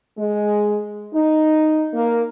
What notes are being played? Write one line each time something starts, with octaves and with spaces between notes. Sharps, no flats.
G#3
D#4
A#3